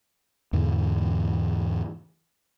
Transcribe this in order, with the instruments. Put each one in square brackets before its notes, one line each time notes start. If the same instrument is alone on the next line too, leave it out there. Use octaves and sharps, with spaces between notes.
[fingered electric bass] E2 G#2 D3 E3